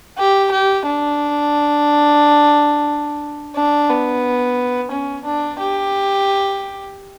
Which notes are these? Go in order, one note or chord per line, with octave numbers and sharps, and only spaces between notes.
G4
G4
D4
D4
B3
C#4
D4
G4